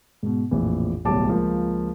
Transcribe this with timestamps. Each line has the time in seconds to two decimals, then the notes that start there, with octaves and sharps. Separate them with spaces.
0.23 G#2 B2
0.51 A#1 F2 A2 E3
1.05 D1 B1 A2 G3 A5 D6
1.29 C#2 F3 A#3